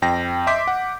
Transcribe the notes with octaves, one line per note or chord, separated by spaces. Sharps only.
F2 G5 A#6
D#5 E5 C6 D6 G6 B6
F#5